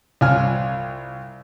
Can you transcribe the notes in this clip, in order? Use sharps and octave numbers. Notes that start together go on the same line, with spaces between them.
C2 F4 G#5 F6